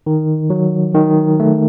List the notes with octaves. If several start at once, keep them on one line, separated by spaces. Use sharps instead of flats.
D#3
F#3
D#3
A3